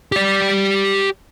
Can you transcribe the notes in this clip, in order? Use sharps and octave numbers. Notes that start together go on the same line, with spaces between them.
G4 D5